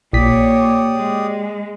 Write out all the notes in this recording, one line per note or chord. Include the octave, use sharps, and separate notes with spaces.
A#1 A#2 G4 C#5 D5 D#6 B6
G#3